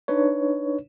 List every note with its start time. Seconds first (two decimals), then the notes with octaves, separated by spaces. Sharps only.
0.08 D4 D#4 B4 C#5